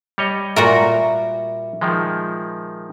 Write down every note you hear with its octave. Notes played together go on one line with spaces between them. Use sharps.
G3 C#5 D#5
A#2 F#4 A#4 E5
D#3 F3 G#3